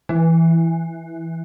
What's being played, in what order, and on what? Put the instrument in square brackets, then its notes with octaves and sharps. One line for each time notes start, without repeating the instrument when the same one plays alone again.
[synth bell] E3